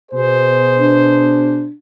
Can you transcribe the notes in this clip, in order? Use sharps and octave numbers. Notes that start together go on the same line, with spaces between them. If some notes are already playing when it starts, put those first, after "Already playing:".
B2 G#4 C5
D4